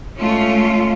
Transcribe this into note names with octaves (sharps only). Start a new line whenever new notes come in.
G#3 A3 C#4 F4